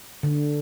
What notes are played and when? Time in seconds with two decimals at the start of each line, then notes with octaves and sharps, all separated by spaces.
0.23 D3